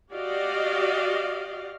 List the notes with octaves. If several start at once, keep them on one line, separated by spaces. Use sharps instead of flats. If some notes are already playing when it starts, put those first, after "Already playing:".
F#4 G4 D5 D#5 F5